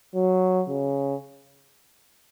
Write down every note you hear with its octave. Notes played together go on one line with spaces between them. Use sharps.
F#3
C#3